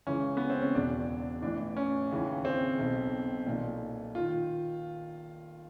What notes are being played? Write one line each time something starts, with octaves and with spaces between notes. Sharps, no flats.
C#2 C#3 E3 C#4
B3
C4
C#4
E1 E2 B2 D4
A1 A2 E3 D4
C#4
D#2 C#3 E3
C4
B1 B2
B1 A#2
D#3 F4